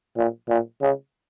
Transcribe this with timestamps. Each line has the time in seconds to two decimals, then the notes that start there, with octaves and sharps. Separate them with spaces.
0.17 A#2
0.49 A#2
0.82 C#3